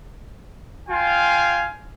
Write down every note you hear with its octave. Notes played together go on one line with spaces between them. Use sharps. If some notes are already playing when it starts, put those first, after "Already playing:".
F4 F5 G5 G#5